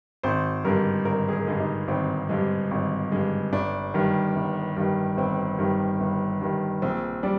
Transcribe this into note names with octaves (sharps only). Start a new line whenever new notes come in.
G#1 C5
G2 D3 G#3 A#4
G#1 A#4
G#4
A#4
G2 D3 G#3
D#4
G#1 C4
G2 D3 G#3
G#1
G2 D3 G#3
G1 D4
G2 D#3
G1
G2 D#3
G1 C4
G2 D#3
G1
G2 D#3
A#1 C4
G3 D4